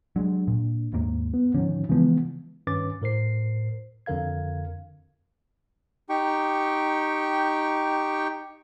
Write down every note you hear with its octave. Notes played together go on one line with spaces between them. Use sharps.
F#3 G#3 D4
A#2
D#2 G#2 A#3
B3
G#2 D3 D#3 F3 C#4
C#3 E3 F3 G#3 B3
G2 D#3 C#4 B4 D6 A6
A2 A#4 C5 C7
F2 D3 A#4 F5 G#6
D#4 G4 G5 C#6